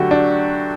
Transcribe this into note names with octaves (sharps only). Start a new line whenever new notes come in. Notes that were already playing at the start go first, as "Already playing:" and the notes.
Already playing: D3 F#3 A3 F#4 G4
D4